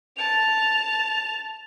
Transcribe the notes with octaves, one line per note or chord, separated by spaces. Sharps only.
A5 F7